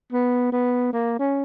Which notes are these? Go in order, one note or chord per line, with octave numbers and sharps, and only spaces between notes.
B3
B3
A#3
C#4